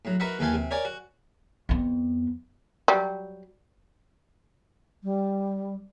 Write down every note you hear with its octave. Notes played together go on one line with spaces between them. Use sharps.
A2 F#3
D#4 F#4 A#4 B4 E5 F#5
D#2 D#3 E3 A4 F5 G#5
C3
A#4 C#5 D5 G#5
F#4
F2 B3
F#3 G3
G3